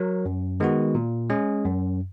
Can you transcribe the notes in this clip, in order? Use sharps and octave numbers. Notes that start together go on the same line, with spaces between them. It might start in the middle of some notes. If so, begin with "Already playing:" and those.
Already playing: F#3 A#4
F#2
D#3 G#3 B3 F#4
A#2
G#3 C#4 G#4
F#2